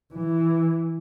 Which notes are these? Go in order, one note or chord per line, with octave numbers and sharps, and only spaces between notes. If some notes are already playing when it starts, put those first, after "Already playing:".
E3